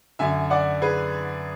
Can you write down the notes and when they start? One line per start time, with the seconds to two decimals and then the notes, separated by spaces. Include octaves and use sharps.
0.19 F#2 D3 E5 G#5
0.50 D5 F#5
0.82 G#4 B4